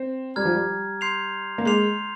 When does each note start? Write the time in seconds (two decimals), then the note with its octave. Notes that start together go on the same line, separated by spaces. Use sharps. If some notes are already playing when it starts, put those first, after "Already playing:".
Already playing: C4
0.36 G3 A#5 F6 G#6
0.45 F3
0.55 G3
1.01 C6 G6 C7 F7
1.58 A#3
1.65 G#3 C6 G6 C7 F7